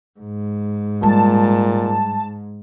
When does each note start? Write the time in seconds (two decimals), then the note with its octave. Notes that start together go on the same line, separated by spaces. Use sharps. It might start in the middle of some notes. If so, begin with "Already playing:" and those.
0.20 G#2
1.03 A#2 G3 G#3 A5